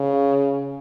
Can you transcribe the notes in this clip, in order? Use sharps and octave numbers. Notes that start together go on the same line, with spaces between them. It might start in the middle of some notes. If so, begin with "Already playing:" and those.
Already playing: C#3